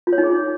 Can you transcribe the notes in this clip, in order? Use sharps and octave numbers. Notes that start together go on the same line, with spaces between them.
F4
C#5
D#4
G#4